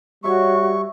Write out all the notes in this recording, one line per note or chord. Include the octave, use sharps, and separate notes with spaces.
G3 F#4 C#5 E5 C#6